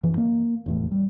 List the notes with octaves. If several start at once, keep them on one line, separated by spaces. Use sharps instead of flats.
F#2 E3 F3
A#3
F1 E2 A2
G3